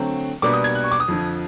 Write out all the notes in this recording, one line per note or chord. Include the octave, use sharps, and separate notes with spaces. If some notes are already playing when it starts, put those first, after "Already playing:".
Already playing: D3 F#3 A3 C4
B2 G3 A#3 D4 D6
D#6
G#6
F#6
C#6
D6
D#6
F2 D3 F3